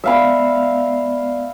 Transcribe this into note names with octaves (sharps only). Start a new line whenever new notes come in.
G#3 B3 D5 E5 F5 B5